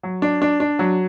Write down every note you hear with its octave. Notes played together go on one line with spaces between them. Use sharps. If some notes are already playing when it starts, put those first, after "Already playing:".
F#3
D4
D4
D4
F#3